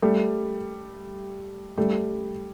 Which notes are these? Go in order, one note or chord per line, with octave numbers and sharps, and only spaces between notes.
G3 A3
G3 A3